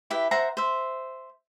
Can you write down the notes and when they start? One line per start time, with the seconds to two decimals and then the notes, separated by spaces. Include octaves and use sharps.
0.10 E4 G4 B4 E5
0.31 C5 E5 F#5 A#5
0.57 C5 E5